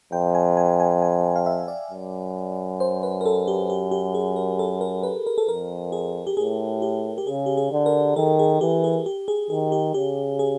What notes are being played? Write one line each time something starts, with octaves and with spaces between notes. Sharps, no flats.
F2 G5
G#5
G#5
G#5
G#5
F5
E5
D5
F#2
C5
B4
A#4
A4
G4
G4
G4
G#4
A#4
A4
A#4
B4
A#4
A4
F2 A#4
G#4
G4
A2 G#4
G4
G4
C#3 G#4
G4
G#4
D3
A#4
D#3 A4
G#4
E3 G4
G#4
G4
G#4
D#3 G#4
G4
C#3 G4
G#4